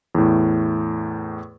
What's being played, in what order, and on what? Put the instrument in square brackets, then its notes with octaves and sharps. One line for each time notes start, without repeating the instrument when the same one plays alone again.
[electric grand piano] E2 A2